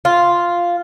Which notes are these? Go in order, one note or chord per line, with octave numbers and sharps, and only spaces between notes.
F4